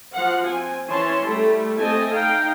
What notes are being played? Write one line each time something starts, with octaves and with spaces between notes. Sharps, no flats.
F3 F#4 F5 F#5
C4 G#5
E3 C#4 C#5 A5 C6
G3 A3 E4 A4
A3 C4 D#5 G#5 A5
D#4 F5 G5